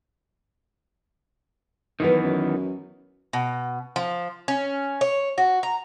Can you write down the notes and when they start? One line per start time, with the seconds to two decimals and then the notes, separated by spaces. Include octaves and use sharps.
2.00 D#3 E3 F#3 B3 D#4 B4
2.23 F#2
3.33 B2
3.96 F3
4.48 C#4
5.01 C#5
5.38 F#4
5.63 A#5